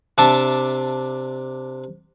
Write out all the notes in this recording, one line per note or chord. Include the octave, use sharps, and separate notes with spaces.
C3 D4 E5 A5